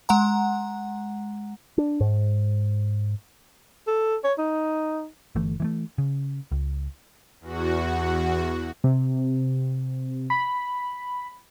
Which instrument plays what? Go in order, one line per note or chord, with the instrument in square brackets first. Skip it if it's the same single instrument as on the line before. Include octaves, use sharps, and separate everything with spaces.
[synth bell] G#3 F#5 A#5
[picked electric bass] D4
G#2
[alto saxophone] A4
C#5
D#4
[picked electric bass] G1 E3 A3
E3 G#3 A3
C#3
C#2
[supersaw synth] E2 F#4
[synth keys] C3
B5